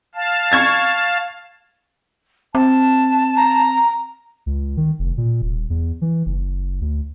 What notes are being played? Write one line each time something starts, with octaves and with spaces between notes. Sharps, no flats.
F5 A5
C#6 G#6 A6
C4 A5
A#5
C#2
D#3
F1
A#2
D#1
E2
E3
F#1
D2